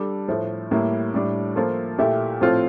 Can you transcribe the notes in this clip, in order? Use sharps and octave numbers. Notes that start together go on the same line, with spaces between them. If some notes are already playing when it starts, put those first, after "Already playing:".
Already playing: G3 D4 A4
A2 F3 A3
A2 G3 A#3 E4
A2 G3 D4
F3 A#3 F4 A4
A#2 A3 E4 G4
A2 F3 C4 F4 A4